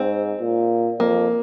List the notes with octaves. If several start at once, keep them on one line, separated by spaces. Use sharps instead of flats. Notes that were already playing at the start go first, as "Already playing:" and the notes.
Already playing: G#2 C4
A#2
F2 A#3